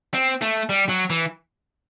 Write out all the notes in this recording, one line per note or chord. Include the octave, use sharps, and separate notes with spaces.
C4
A3
G3
F#3
E3